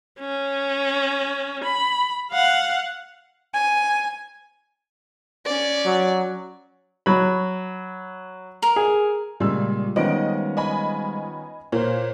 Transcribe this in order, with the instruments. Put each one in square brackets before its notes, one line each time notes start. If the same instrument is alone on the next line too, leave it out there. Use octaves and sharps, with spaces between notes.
[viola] C#4
B5
F5 F#5
[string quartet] G#5
[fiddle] C#4 D5
[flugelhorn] F#3
[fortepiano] F#3 B5
[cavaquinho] A#4
[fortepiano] G#4
[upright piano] A#2 E6 [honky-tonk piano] C#3 [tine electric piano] G3 G#3
[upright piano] D#3 B3 C#4 [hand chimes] F4 C5 [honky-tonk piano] D#5 D7
[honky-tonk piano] D#5 G#5 B5
[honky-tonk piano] A#2 [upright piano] A#4 C5 [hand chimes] C#5